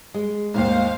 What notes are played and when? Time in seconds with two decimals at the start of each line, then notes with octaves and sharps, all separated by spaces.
0.14 G#3
0.54 D#2 G#2 C5 F5